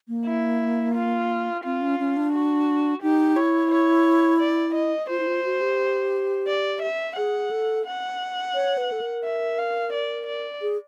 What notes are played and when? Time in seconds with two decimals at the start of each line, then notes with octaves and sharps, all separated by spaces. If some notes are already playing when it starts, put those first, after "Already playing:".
0.08 A#3
0.26 E4
0.95 F4
1.65 C4 F4
1.81 C#4
1.99 C#4
2.17 D4
2.33 F#4
3.03 D#4 G4
3.36 E4 C#5
3.71 C#5
4.40 D5
4.75 D#5
5.09 F4 C5
5.20 E4
5.27 F4
5.44 F#4
5.61 G4
6.47 D5
6.82 E5
7.17 G#4 F#5
7.51 A4
7.86 F#5
8.54 C#5
8.78 B4
8.92 A4
9.01 A#4
9.24 E5
9.58 F5
9.93 D5
10.27 D5
10.62 G#4